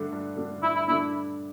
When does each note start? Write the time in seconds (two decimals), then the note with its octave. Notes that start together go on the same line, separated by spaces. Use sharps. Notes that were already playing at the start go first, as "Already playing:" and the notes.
Already playing: G2 D3 A3 D4
0.12 G2
0.37 D3 A3 D4
0.62 G2 E4
0.75 E4
0.88 D3 A3 D4 E4